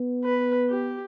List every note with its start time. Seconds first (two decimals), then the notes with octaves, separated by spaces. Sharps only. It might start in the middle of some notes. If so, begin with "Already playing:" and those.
Already playing: B3
0.24 B4
0.69 G4